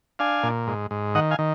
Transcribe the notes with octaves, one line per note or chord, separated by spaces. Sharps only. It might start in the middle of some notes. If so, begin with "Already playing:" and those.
D4 F5 G#5
A#2
G#2
G#2
D#3 D#5 F#5
F5 G#5
D#3